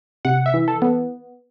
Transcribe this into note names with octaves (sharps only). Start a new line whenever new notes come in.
C3 F#5
E5
E3
A4
B3